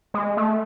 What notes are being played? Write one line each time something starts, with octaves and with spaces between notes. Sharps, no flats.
G#3
A3